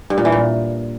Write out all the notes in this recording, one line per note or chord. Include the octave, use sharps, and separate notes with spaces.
G2
A#2
E3
A#2